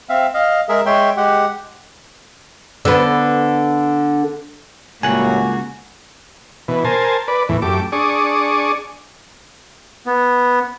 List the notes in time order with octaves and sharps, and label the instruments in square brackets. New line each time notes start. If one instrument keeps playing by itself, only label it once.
[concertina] C4 E5 F5
D#5 F5
G#3 G#4 A#4 E5
G#3 C#5 E5 G5 C6
G#3 G4 F#5
[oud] D3 B3
[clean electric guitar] C#2 F#5 [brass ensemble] A2 F#3 G3 [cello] A#3 F#4 [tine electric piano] G#5
[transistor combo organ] B2 E3
A#4 C5 G#5 A5
B4 D5
E2 A2 E3
F#2 A3 G4 D6
D4 G#4 D5 C#6 D#6
[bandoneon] B3